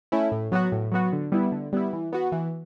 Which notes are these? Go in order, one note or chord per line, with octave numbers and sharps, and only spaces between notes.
A3 C#4 E4
A2
F#3 B3 F#4
A2
F#3 B3 F#4
D3
G3 B3 E4
D3
G3 B3 E4
E3
B3 F#4
E3